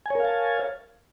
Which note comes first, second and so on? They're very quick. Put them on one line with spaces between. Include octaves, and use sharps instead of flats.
G#5 C#5 A#4 F5 A5